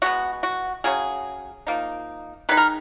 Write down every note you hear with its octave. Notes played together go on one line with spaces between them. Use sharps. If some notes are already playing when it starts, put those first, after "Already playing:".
B2 G#3 B3 F#4
F#4
C#3 F#3 C#4 G#4
F3 A#3 D#4
D#3 G#3 D#4 B4
A#4